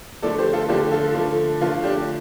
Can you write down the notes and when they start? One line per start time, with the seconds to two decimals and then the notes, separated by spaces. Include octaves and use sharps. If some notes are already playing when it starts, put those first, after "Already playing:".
0.22 D3 F3 A3 A4 D5
0.38 G4 C5
0.53 F4 A4
0.69 D3 F3 A3 D4 G4
0.92 F4 A4
1.15 D3 F3 A3
1.61 D3 F3 A3 F4
1.84 D4 G4